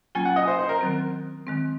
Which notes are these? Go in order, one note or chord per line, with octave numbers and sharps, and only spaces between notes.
F#3 A#3 C#4 F4 G#5
F#5
D#5
C5
C5
A#4
D#3 F#3 C4
D#3 G#3 C4